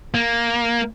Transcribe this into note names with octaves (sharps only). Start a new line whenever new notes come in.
A#3